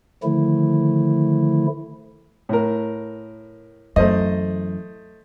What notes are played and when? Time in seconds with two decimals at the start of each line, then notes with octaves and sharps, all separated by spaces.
0.23 D3 D#3 F3 A3 E4
2.49 A2 A#4
3.96 F#2 E3 A3 C5 D#5